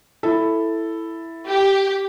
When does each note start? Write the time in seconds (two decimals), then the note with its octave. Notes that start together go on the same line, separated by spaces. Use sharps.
0.23 E4 A4
1.47 G4